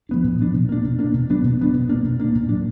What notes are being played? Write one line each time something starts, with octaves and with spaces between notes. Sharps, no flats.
F3 B3 D4
A#2
F3 B3 D4
B2
A#3 D4
B2
A#3 D4
B2
F#3 B3 D4
B2
F#3 B3 D4
B2
A#3 D4
B2
A#3 D4
A#2
F#3 D4